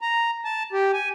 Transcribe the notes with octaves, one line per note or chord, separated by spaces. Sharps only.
A#5
A5
G4
G#5